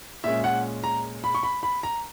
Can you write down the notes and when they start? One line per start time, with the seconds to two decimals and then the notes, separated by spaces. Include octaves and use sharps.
0.24 A#2 G#3 C#4 E5
0.44 F#5
0.84 A#5
1.24 B5
1.35 C#6
1.43 B5
1.63 B5
1.83 A#5